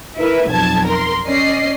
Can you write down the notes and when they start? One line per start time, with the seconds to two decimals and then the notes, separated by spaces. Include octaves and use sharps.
0.19 E4 A#4 B4 E5
0.49 B1 F2 A5 G#6
0.86 A#4 C6
1.26 C#4 D5 D#5 C7